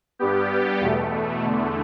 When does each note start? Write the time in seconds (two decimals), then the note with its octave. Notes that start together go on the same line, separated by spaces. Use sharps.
0.19 G2 G3 B3 G4
0.81 E2 B2 A3
1.43 E2 D3 A3